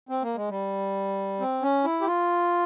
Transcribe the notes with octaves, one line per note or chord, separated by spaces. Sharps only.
C4
A#3
G#3
G3
C4
C#4
E4
G4
F4